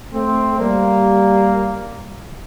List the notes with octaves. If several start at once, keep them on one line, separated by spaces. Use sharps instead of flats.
A3 C4
G3 A#3